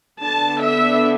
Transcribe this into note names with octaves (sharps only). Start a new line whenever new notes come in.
D3 B3 D4 A5
E5